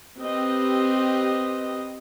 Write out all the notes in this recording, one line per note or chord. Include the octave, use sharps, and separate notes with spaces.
C4 G4 B4 D#5